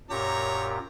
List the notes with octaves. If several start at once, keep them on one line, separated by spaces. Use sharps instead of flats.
F#2 A#2 G4 C#5 A#5